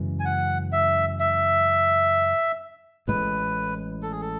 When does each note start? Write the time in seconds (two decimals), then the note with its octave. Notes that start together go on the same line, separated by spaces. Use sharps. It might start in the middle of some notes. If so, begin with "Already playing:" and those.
Already playing: F#2 C#3 E3 G#3
0.20 G#5
0.25 F#5
0.72 E5
1.20 E5
3.08 A1 A2 G#3 B4
4.03 A4
4.12 G#4
4.21 A4